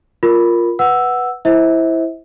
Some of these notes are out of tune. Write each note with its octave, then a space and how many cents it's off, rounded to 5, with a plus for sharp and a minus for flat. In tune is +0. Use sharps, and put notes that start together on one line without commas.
F4 +0 A#4 +0 B5 +0
B4 +0 F#5 +0 E6 +0
E4 +0 C5 +0 E5 -35